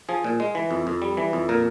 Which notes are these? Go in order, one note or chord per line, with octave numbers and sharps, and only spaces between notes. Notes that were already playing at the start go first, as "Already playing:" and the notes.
F3 G#4
A#2
G#3
E3
F2
F2
G3
E3
F2
A#2 A#4